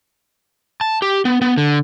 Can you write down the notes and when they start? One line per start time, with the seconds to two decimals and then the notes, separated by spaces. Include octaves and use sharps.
0.81 A5
1.02 G4
1.25 B3
1.42 B3
1.58 D3